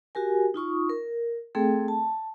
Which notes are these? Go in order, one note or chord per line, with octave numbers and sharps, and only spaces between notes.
F#4 G4 A#4 G#5
D#4 F4 C#6 D#6
A#4
A3 C4 G#4 A4 G5
A5